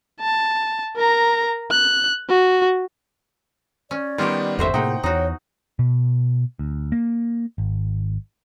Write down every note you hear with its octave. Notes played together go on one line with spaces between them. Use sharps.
A5
A#4 A#5
F#6
F#4
C#4 D5
D#3 G3 B3 F4 G4
G1 E2 F#4 A4 C5 E5
A2 C3 A#3 D#4 G#4 F#5 G5
E2 D#4 F#4 C#5
B2
D2
A#3
G#1